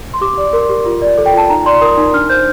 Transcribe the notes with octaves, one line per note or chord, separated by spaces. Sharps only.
C6
G4 D6
D5
A#4 C6
G4
F4
D5
A4
G5
F4 A5
D#4 A#5
D5 C6
A#4 D#6
D#4
D4 F6
C5 G6